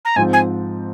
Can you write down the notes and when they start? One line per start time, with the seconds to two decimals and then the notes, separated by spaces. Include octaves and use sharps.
0.05 A#5
0.16 G#2 F3 C4 G#5
0.33 G#5